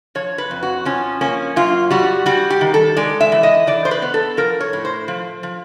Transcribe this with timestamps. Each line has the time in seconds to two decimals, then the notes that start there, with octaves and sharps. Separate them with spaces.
0.15 F3 C#5
0.38 B4
0.51 F2
0.63 F#4
0.85 F3 C#4
1.21 A#3 C#4
1.56 F#2 F4
1.91 G3 F#4
2.26 G3 F#4
2.50 G4
2.61 D#3
2.74 A4
2.97 G#3 D5
3.21 E5
3.32 E3
3.43 D#5
3.67 E3 D5
3.85 C5
3.91 B4
4.02 B3
4.14 A4
4.37 F3 A#4
4.61 C#5
4.73 A2
4.85 C5
5.08 F3
5.43 F3